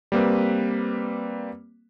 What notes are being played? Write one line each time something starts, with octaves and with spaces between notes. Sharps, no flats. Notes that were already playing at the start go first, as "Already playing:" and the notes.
G3 A#3 C4 B4